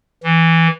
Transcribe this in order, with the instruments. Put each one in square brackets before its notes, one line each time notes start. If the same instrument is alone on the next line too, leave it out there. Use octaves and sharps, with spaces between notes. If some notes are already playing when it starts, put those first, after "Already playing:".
[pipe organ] E3